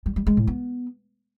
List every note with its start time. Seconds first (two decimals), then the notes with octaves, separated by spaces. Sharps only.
0.06 G3
0.16 G3
0.27 G#3
0.37 A2
0.47 B3